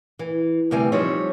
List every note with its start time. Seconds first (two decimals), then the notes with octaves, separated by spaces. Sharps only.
0.19 E3
0.71 D2 C3 E3 G3 G#5
0.92 F3 G3 C4 D#4 C5 C#5